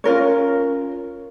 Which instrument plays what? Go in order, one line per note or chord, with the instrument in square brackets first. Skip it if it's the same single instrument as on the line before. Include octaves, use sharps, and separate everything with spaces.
[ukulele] C#4 F4 A#4 C#5